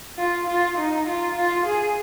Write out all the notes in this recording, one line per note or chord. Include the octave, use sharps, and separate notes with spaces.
F4
F4
D#4
F4
F4
G#4